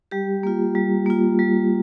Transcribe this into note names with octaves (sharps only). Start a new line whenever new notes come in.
G3 G4
A#3 F4
G3
A#3 F4
G3